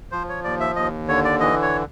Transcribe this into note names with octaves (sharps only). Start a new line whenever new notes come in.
F3 C5
C#5
D#2 D5
E5
D#2 D#5
D3 C#5
D5
E3 D#5
C#5